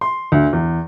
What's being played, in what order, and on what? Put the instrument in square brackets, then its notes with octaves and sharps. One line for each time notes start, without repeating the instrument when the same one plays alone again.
[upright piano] C6
D2
E2